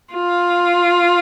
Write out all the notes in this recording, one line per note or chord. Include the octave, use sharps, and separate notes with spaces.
F4